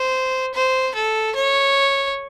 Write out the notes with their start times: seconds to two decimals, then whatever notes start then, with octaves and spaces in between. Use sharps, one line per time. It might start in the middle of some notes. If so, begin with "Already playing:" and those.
Already playing: C5
0.54 C5
0.95 A4
1.35 C#5